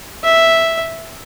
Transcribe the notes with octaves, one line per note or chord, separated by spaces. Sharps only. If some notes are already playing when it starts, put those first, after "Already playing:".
E5